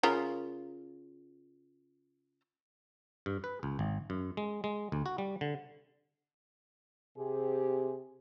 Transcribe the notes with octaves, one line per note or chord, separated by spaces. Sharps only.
C#3 F4 A#4
G2
B4
C#2
G#1
F#2
G#3
G#3
D2
F#4
G3
D3
C3 G4 G#4